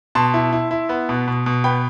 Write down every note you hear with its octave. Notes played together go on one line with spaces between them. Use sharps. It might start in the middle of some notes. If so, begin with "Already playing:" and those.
B2 A5 C6
E4
E4
E4
B3
B2
B2
B2
B3 G5 B5